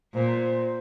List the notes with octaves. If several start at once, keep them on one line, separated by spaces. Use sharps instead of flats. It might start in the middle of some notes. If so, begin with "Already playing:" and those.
A#2 C5